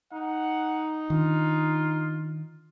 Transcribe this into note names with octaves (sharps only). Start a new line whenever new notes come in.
D#4 F#5
D#3 D4 F4